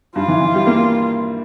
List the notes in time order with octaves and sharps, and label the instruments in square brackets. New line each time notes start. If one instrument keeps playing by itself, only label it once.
[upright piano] G2 [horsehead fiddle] F4
[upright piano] E3
E3
G3
A#3